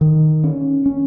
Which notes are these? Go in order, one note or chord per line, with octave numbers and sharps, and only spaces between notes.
D#3
C#4
C#4